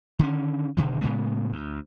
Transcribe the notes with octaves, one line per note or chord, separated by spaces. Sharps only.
D3 D#3 A3 C#4
F#1 B2 D3 D#3
A2 C#3 G#3 B3
D2